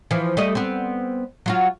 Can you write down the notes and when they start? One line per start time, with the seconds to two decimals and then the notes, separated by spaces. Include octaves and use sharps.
0.11 E3 F3
0.37 G3 A3 D#5
0.55 B3 C4
1.46 F#3 F4 F#4